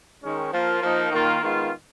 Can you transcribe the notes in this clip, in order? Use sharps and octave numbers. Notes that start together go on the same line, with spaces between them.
D#3 G#3 C#4
F3 A#3 F4
F3 A#3 D#4
D#3 A#3 F4
D#3 G#3 B3 F4